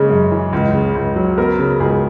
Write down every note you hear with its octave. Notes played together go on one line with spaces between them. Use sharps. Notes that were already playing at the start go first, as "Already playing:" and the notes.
Already playing: C#3 G#3 A#3
F#2
E3
C#2
C#3
C#2
F#3
B3 A#4
C#3
C#2 G#4